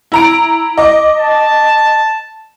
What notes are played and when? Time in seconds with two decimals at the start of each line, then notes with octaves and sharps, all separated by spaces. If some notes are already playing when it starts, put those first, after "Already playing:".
0.12 E4 A#5 D7
0.78 D#5 D6
1.16 A5